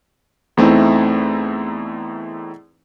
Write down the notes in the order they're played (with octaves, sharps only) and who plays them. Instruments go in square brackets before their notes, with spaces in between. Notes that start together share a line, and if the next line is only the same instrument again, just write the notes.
[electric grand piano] E2 A3 C4 D#4 E4